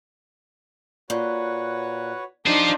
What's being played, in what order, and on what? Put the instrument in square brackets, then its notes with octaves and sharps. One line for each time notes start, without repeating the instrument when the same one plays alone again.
[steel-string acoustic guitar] A#2 [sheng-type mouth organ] F#4 B4 C#5
[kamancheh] D4 D#4 [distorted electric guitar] F4 C5 [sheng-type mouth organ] G4